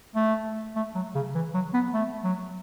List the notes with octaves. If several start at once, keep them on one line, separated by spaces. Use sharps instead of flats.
A3
A3
F#3
C#3
E3
F#3
B3
A3
F#3